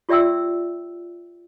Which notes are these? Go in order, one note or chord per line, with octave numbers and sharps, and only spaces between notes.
F4 G4 D5 E5 G5 E6